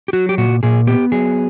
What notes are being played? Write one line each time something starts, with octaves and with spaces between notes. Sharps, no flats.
G4
F#3 F#4
G4
A#2 F#4
A#2 G#4
B3 G4
F#3 G#4